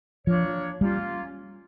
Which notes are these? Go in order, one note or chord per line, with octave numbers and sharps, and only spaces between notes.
F3 A#3 D4 F4 A#4 C#5
G3 A#3 C#4 F4